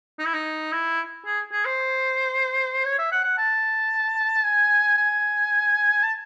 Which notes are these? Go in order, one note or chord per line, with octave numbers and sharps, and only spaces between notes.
D#4
E4
D#4
E4
G#4
G#4
C5
C#5
E5
F#5
F#5
A5
G#5
G#5
A5